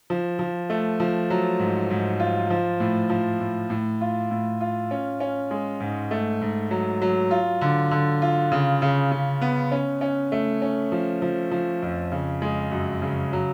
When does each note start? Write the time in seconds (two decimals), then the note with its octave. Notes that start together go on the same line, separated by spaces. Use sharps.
0.10 F3
0.39 F3
0.70 A3
1.00 F3
1.30 F#3
1.59 G#2
1.90 G#2
2.20 F4
2.50 F3
2.80 A2
3.10 F3
3.40 A2
3.70 A2
4.01 F4
4.31 A2
4.61 F4
4.91 C#4
5.20 C#4
5.51 G#3
5.80 G#2
6.11 A3
6.41 G#2
6.71 F#3
7.02 F#3
7.31 F4
7.61 D3
7.91 D3
8.22 F4
8.52 C#3
8.82 C#3
9.12 C#3
9.41 B3
9.72 C#4
10.01 C#4
10.32 A3
10.62 C#4
10.92 F3
11.22 F3
11.51 F3
11.83 F2
12.12 C#3
12.42 G#3
12.72 F#2
13.02 C#3
13.33 F#3